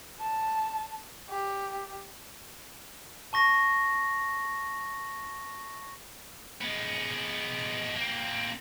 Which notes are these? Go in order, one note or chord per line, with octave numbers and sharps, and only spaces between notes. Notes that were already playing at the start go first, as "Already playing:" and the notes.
A5
G4
A5 C#6 A#6
G#3 B3
A#3 C4